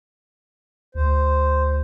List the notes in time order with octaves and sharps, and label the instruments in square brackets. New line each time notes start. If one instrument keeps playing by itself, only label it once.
[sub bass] D2 [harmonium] C5